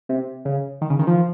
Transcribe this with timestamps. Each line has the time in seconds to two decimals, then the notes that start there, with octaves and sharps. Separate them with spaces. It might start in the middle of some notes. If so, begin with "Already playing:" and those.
0.09 C3
0.45 C#3
0.81 D#3
0.90 C#3
0.99 D#3
1.07 F3